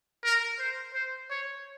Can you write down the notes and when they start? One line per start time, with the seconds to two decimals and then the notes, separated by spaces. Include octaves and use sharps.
0.24 A#4
0.59 C5
0.94 C5
1.30 C#5